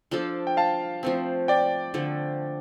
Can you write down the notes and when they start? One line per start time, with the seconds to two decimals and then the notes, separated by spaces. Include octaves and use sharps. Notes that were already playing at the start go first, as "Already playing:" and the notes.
0.11 F3 D4 F4 A4
0.47 G5
0.57 F5 A5
1.03 F3 A3 C4
1.48 D5 G5
1.94 D3 F3 A3